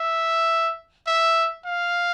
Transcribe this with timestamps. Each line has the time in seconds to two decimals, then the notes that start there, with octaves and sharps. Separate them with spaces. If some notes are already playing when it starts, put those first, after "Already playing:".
Already playing: E5
1.07 E5
1.65 F5